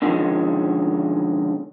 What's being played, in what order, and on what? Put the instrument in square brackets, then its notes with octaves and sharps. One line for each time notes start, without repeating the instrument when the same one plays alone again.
[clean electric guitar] B2 D3 D#3 F3 G#3 C#4